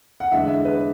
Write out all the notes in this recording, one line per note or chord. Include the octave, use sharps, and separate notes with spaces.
F#5
E2 D3 G#3 E5
E5
B4